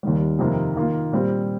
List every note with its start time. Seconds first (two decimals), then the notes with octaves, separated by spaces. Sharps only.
0.03 D#2 D#3 G3
0.39 F2 C3 D#3 A#3 F4
0.76 D#3 A#3 F4
1.12 A#2 G3 C4